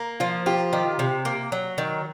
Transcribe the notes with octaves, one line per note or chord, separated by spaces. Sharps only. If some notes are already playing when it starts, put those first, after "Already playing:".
Already playing: A#3
F3 F4
F4 G4
D#3 G4
C3
A#3
F#3
D#3